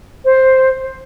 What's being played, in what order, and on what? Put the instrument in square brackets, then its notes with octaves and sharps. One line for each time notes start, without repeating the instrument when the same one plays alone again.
[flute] C5